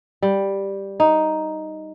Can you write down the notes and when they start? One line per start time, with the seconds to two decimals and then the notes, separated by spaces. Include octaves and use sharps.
0.22 G3
1.00 D#4